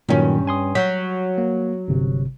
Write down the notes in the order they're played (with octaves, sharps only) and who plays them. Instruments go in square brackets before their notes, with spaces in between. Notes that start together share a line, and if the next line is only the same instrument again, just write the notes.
[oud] G2 C#4 [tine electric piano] A#2 D#3 F#3
[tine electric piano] G#5 C6 D#6
[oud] F#3 [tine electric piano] G6 B6
[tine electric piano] A#3
G1 C3